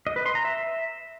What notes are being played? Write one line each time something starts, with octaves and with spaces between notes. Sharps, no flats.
D#5
B4
C6
A#5
E5